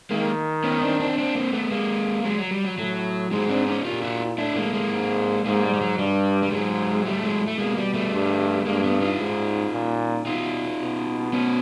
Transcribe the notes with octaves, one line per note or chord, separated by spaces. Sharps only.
D#3 G#3 A#3
B3 C#4
C4 D4
C4 D4
C4 D4
A#3 C4
A3 B3
G#3 A#3
F#3 G#3
F#3
G3
F#3
A2 F#3
G#2 F#3 G#3
C4 D4
C#4 D#4
A#2 F4 G4
E4 F#4
A2 D4 E4
G#3 A#3
G#3 A#3
G#2
G#2 G#3 A#3
G3
G3
F#3
G2 G3
G3
G#2 F#3 G#3
A2 G3 A3
F#3 G#3
A3
B2 G#3 A#3
G3
G3 A3
G2
G2 G#3 A#3
A3 B3
D#4 F4
G#2
A#2
B2 D#4 F4
B2
B3 C#4